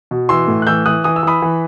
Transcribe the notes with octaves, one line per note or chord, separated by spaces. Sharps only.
B2
E3 C6 E6
A2
F#6
E3 E6 G6
E3 D#6 F#6
E3 D#6
E6
E3 B5 D#6
E3